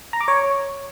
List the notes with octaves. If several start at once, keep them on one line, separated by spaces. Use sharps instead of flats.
A#5
D6
C#5